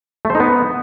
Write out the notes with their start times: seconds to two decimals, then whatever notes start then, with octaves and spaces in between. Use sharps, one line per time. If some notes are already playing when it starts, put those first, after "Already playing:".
0.25 A3
0.30 C5
0.35 D#4
0.40 B3